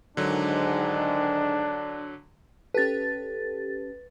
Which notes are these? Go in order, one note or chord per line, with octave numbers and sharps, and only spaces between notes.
G#2 D3 D#3 F#3 D4
C#4 G4 A4 B4 A6